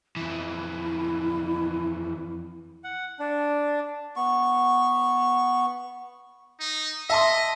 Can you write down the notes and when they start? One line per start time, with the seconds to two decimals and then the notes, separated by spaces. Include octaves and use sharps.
0.16 F2 E3 E4
2.84 F#5
3.20 D4
4.16 B3 C#6
6.60 D#4
7.10 D#5 E5 A5 C6